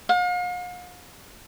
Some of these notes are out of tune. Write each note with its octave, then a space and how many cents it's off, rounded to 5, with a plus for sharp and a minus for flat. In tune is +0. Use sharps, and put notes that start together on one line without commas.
F5 +40